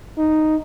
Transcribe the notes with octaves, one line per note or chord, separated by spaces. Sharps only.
D#4